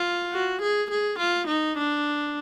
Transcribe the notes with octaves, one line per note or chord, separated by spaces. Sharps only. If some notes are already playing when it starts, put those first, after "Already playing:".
Already playing: F4
F#4
G#4
G#4
F4
D#4
D4